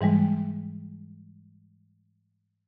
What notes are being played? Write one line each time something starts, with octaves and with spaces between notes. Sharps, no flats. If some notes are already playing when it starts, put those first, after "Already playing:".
G#2 E3 G3 G#3